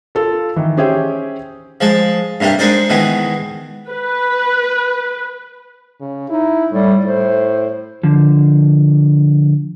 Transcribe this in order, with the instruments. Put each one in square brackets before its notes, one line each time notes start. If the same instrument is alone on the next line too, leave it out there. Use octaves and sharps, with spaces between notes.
[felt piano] F4 A4 A#4
D#3 E3
C#4 G4 G#4 C5 E5 G5
[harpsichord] F3 G#3 A5
G2 C3 A#3 D4 G4
G#3 D4 D#4 A#4 C5 D5
B2 D#3 E3 G#3 B3
[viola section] B4
[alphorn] C#3
[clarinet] D#4 [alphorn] E4
[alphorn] A2 [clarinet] G3
[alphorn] A2 [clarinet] C5
[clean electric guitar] D3 F3